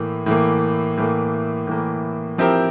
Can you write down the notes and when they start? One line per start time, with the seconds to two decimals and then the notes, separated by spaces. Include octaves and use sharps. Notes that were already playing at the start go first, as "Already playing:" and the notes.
Already playing: A2 E3 A#3
0.26 A2 E3 A#3
0.97 A2 E3 A#3
1.67 A2 E3 A#3
2.38 F3 C4 E4 G4 A#4